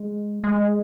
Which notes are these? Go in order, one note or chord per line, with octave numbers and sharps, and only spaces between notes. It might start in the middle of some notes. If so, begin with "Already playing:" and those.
Already playing: G#3
G#3